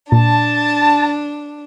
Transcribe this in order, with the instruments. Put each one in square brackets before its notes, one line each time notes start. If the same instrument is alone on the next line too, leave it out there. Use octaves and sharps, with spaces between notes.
[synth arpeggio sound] A#2 [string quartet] D4 [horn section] A5